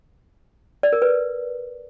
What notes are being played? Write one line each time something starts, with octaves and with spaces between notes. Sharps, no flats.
D5
A#4
B4